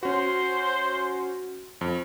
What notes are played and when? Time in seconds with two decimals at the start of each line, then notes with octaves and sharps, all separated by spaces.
0.03 C#4 F#4 C5
1.81 F2